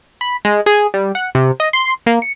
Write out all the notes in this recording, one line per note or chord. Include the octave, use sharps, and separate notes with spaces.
B5
G#3
G#4
G3
F#5
C3
D#5
C6
A#3
C#7